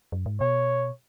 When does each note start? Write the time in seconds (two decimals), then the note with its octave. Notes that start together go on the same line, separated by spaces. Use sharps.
0.12 F#2
0.26 G#2
0.41 B2 C#5